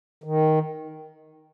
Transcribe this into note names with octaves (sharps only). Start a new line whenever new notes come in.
D#3